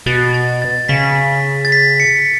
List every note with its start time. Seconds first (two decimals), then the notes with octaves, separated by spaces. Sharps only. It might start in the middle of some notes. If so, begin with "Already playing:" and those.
0.06 B2 A6
0.34 A6
0.62 A6
0.88 C#3 B6
1.65 A6
1.72 B6
2.00 C#7